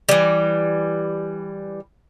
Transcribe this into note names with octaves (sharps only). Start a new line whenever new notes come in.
E3 G3